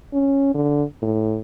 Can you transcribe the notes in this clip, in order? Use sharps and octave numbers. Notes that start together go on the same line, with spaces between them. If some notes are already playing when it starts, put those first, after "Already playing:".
C#4
D3
A2